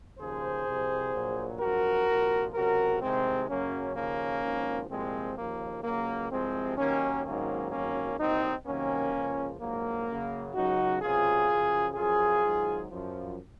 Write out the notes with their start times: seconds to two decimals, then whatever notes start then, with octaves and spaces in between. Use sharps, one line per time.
0.19 D#2 C#3 F3 G#4 C5
0.65 C2 C3 F3
1.12 A#1 A#2 F#3
1.59 G#1 F#2 F3 F#4 A#4
2.07 C2 A#2 F3
2.53 C#2 C3 F#3 F#4 A#4
3.01 C2 C3 D#3 G#3 C4
3.47 F#2 C#3 F#3 A#3 C#4
3.95 D#2 C#3 F3 A#3 C#4
4.42 G#1 G#2 F3
4.89 C2 A#2 F3 G#3 C4
5.37 D#2 C#3 F3 A#3
5.84 C#2 C#3 F#3 A#3
6.30 C2 C3 F3 G#3 C4
6.77 D#2 D#3 F#3 A#3 C#4
7.24 G#1 G#2 D#3 F#3 A#3 C#4
7.71 G#1 F#2 D#3 F#3 A#3 C#4
8.18 C2 A#2 F#3 C4 D#4
8.65 C2 C3 D#3 F#3 A#3 C#4
9.13 C#2 C#3 F3
9.60 A#1 G#2 F#3 A#3
10.07 F#2 C#3 F#3
10.53 C#2 C#3 F#3 D#4 F#4
11.01 C#2 C3 F#3 F4 G#4
11.47 F#2 C#3 F3
11.95 F#2 F3 F4 G#4
12.43 G#1 G#2 F#3
12.90 F#2 F3